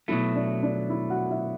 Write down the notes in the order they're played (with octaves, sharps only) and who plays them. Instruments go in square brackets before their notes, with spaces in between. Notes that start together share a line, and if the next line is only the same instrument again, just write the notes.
[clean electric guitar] B2 F#3 A3 [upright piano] E4 E5
[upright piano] D4 D5
D4 D5
E4 E5
F#4 F#5
E4 E5